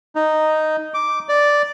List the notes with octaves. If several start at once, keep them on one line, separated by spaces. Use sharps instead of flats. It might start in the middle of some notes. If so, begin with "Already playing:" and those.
D#4
D6
D5